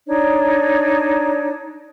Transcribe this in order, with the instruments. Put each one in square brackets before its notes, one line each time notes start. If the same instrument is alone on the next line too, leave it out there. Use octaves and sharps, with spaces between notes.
[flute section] D4 D#4 C#5 D5